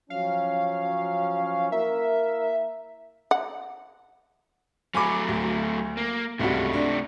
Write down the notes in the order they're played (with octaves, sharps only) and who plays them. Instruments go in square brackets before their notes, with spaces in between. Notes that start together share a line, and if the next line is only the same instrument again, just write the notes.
[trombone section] F3 F#3 C#4 [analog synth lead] F5
[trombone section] A#3 E4 A#4 [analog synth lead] E5
[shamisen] F#5
[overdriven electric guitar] F#3 A3 [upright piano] G#5 B5 D6
[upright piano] D2
[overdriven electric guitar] A#3
[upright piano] C#2 G2 F#4 [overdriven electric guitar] C3 A3
[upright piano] D4